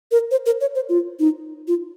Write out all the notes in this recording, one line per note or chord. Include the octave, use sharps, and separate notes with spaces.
A#4
C5
A#4
C#5
C5
F4
D#4
F4